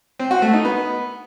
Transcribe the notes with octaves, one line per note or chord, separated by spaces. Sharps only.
C4
F#4
A3
D#4
B3